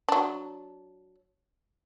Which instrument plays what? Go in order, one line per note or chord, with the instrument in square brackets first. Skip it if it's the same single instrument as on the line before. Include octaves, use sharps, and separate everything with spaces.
[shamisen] F#3 D4